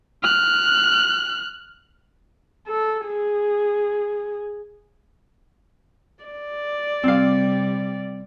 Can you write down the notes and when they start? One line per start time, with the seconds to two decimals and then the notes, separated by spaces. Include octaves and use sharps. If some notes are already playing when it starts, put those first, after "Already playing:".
0.22 F6 F#6
2.67 A4
3.06 G#4
6.24 D5
7.04 C3 G3 C4 F5